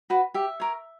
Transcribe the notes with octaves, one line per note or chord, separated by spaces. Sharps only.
F#4 B4
G4 E5
A#4 C#5